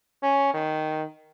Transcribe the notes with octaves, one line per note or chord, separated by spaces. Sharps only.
C#4
D#3